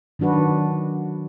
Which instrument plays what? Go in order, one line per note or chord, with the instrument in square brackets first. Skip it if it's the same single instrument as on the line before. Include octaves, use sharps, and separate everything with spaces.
[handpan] D#3 F#3 D4 F#4 B4